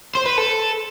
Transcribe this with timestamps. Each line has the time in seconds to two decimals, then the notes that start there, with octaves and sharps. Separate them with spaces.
0.15 C5
0.26 B4
0.38 A4